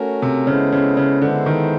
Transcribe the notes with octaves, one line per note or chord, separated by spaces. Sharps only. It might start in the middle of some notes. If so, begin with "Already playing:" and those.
Already playing: A3 C#4 F#4 A#4
C3
C#3 G#3 B3 E4 A4 C5
C#3
C#3
D3 G#3 B3 E4 A4 C5
D#3